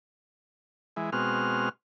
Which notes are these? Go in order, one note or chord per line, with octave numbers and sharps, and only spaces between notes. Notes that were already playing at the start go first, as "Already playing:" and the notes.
E3 G#3
B2 G#3 C4 F#4 F6